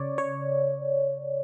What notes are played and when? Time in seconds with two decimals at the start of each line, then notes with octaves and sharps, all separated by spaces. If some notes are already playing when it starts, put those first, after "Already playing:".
Already playing: C#3 C#5 D5
0.18 C#5